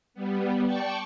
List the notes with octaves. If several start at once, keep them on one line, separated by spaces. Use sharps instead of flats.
G3 B3
D5 G5 A5 C#6